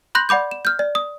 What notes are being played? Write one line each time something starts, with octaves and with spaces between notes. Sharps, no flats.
B5 C6 F#6 G6 A#6 F#7
D5 F#5 B5 D6 G6
E7
F6 G6
D5
D#6